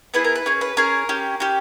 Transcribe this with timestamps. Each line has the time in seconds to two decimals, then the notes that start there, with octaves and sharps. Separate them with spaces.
0.14 B3 E4 G#4 B4
0.24 A#4
0.36 B4
0.46 C#4 G#4
0.61 B4
0.77 C#4 G#4 A#4
1.09 C#4 G4
1.40 C#4 G4